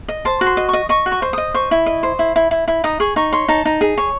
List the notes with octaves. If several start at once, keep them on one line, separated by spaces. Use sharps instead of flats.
D#5
C5 A5
F#4
C6
D#5
D#5 C#6
D#5 C#6
F#4
C#6
C5
D#5 D#6
C5 C#6
E4
D#5
C5
E4
E4
E4
E4
D#4 D#6
G#4 C#6
D#4 C#6
C#5 C6
D#4 A5
D#4
G#4
C#5